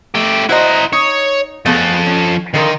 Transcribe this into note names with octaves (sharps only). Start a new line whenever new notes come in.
A3 G4
E4 F#4 C5 D#5 A#5
D#4 C#5
F3 A3 B3 G#4 A4
C#4
D3 D#3 F3 A#4